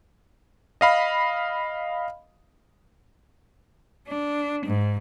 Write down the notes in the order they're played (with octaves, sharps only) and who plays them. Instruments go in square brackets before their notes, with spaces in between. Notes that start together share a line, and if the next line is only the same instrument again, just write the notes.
[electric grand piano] D#5 F5 B5
[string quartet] D4
G#2